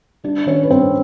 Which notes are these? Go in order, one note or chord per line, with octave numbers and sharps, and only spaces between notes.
G3 D4 D5
D#3 C#4 C#5
B4
G2 C4 C5